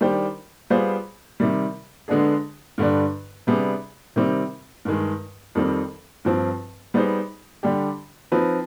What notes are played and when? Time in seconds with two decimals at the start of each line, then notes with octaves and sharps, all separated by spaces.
0.01 D#3 G3 D4 G4 C5
0.70 G3 B3 F4 G#4 C5
1.40 C3 D#3 G3
2.08 D3 G#3 B3 D4 G#4
2.78 G2 D3 G3 D4
3.47 C3 G3 B3 D4 G#4
4.16 C3 D#3 G3 C4
4.85 G2 D#3 G#3
5.55 F2 D#3 G3 C4
6.25 G2 F3 C4
6.94 G3 B3 D#4 G#4 C5
7.63 D3 G3 D4 G4
8.32 F3 C4 D#4 B4